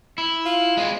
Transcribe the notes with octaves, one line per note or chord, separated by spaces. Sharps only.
E4
F4
G#3 C4